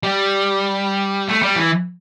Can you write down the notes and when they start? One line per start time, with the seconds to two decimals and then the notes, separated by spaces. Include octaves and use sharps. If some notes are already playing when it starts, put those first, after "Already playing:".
0.03 G3
1.28 A3
1.42 G3
1.56 E3